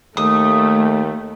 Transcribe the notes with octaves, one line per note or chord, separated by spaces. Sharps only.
D#2 A3 D#6